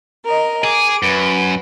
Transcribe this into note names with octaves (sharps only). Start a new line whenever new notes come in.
A#4 D#5
G#4 D6
F#2 B4